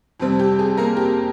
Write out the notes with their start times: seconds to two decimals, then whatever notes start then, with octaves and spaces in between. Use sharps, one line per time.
0.20 F2 C3 G3 C4
0.39 G4
0.59 G#4
0.77 A#3 A#4
0.97 G4